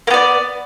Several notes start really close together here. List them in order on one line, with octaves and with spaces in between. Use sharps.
A#3 B3 D5